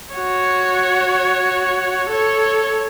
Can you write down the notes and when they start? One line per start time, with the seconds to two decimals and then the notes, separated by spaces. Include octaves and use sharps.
0.14 F#4 C#5
2.09 A4 C#5